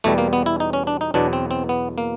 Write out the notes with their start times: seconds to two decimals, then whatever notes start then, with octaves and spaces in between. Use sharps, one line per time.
0.04 E2 B2 G3 A3
0.18 A#3
0.33 B3
0.46 E4
0.60 D#4
0.73 C#4
0.87 D4
1.01 D#4
1.14 E2 B2 F#3 D4
1.33 C4
1.51 C4
1.69 B3
1.98 A#3